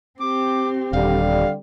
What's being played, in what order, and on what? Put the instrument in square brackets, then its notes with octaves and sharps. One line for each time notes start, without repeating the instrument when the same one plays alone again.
[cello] C4 G4 [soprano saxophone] D6
[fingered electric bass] D#1 [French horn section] D3 G3 [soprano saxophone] F5